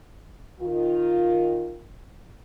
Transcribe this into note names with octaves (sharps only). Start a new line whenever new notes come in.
D#3 F4